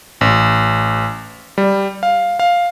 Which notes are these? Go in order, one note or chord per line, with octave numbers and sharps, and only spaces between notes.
A1
G3
F5
F5